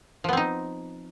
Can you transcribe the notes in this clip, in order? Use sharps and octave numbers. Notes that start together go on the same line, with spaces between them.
F3 B3 C4 D#4